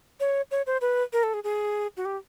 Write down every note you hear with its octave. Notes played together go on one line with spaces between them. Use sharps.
C#5
C#5
C5
B4
A#4
A4
G#4
G#4
F#4
G4